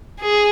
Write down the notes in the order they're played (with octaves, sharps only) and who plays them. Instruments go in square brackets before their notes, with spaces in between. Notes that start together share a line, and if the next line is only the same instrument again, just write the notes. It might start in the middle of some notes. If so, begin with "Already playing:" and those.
[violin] G#4